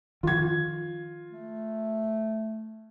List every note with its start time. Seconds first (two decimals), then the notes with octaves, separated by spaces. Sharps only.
0.23 D#3 F3 F4 G#6
1.30 A3